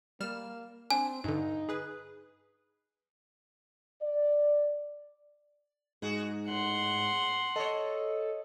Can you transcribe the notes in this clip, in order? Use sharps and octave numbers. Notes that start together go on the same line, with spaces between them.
G3 A#3 F6 E7
C4 D4 G#5
G2 D3 D#4
G#4 B4
D5
G#2 F#4 G#4
A2 F#5 C6
A4 C#5 D#5